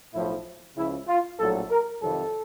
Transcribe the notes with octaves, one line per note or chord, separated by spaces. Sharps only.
B1 A2 F3 E4
C#2 C#3 F3 E4
F4
A#1 A2 F#3 A4
A#4
F2 C3 D#3 F#3 A4